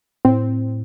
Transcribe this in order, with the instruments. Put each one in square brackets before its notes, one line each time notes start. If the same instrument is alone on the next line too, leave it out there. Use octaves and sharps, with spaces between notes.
[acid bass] A2 [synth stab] C4